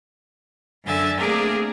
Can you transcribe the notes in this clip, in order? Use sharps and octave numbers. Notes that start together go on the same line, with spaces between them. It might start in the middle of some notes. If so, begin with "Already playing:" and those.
F#2 D3 E5 G#5 A6
A3 A#3 C4 D4 G#4 A#4